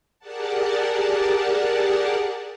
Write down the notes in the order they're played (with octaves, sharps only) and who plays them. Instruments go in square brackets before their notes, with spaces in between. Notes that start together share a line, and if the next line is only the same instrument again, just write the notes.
[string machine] G4 G#4 A#4 D5 F#5 A5